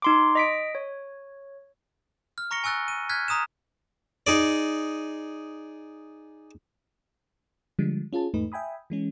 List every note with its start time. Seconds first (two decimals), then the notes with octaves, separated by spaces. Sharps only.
0.02 D#4 C6 D6
0.35 D#5 B6 D7
0.75 C#5
2.38 F6
2.51 A#5 C#6 A#6 C#7 G7
2.64 G#5 C#6 E6 F#6 A6
2.88 D#7
3.09 F6 F#6 G#6 B6
3.28 A#5 D#6 D#7 E7
4.27 D#4 G#4 D5
7.79 D3 F3 G3 G#3
8.13 C#4 F4 G#4 A5
8.34 E2 G#2 A3 D#4 B4
8.52 E5 G5 G#5 B5 D#6
8.90 E3 G#3 C#4